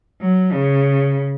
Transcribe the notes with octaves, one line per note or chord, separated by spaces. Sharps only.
F#3
C#3